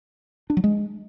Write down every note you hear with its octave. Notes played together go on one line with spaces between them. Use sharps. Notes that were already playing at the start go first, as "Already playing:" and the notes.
D4
F#3
G#3